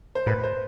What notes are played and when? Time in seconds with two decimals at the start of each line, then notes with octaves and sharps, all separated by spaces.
0.15 C5
0.26 A2 B4
0.43 C5